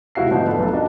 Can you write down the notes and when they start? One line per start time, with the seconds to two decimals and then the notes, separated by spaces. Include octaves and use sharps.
0.15 F1 C3 E4 F#4 F5 C7
0.30 G#2 D3 F3 B3 C4 D#4
0.46 A4 B4 D5
0.58 B1 F2 A3 A4
0.73 D4 F#4 A#4 D5 D#5